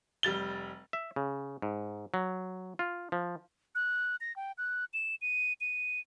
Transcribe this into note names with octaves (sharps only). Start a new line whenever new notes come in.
F1 G3 A6 G7
E5
C#3
G#2
F#3
F4
F3
F#6
A#6
G5
F#6
E7
D#7
D#7